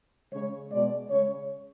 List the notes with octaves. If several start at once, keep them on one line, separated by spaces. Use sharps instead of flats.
C#3 G#3 C#5
B2 G#3 D5
C#3 G#3 C#5